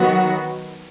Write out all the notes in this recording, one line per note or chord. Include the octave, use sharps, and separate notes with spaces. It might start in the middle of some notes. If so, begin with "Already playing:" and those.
Already playing: D#3 F#3 B3 F#4